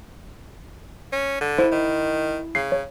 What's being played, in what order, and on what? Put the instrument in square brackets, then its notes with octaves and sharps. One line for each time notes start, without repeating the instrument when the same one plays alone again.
[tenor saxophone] C#4
D3
[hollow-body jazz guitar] E4 [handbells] C5
[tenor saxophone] D#3
[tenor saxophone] C#3 [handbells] C7
[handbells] C#5